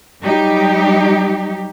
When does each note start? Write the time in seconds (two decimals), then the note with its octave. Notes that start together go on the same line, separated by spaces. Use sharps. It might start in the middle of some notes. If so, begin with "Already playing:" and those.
0.22 F#3 G3 D#4 G4